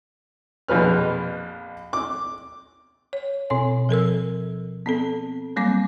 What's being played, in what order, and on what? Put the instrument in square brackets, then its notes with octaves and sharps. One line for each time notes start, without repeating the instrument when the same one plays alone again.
[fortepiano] A#1 F2 B2 B4 F6
D6
[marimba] C#5
B2 C4 C#5 G#5
F3 A4 A#4 E6
B3 C4 A4
F#3 G3 A#3 C4 D6